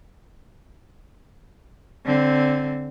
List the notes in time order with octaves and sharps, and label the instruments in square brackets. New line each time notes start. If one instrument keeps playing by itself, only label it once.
[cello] D3 C4